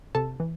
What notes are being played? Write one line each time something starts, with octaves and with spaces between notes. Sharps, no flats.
C3 A4 A5
E3